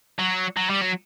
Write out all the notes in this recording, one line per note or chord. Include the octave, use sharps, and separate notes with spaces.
F#3
F#3
G3
F#3